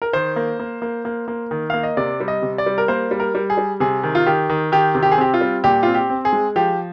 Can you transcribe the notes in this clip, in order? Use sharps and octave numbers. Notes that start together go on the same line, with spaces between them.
A#4
D#3 C5
A#3
A#3
A#3
A#3
A#3
D#3
A#3 F5
D#5
C3 D5
G3
D#5
C3
D5
G3
A#4
A#3 C5
G3
A#4
G3
G#4
G3
C3 G#4
D#3
F4
D#3 G4
D#3
D#3 G4
C3
G4
G#4
C4 G4
F4
G3
A#2 G4
C4 F4
G4
C4
G#4
G#3
F3 G4